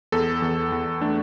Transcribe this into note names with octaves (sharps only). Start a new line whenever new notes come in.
E2 A4
E2
E2
A3 D4